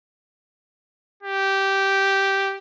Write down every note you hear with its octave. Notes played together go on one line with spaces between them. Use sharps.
G4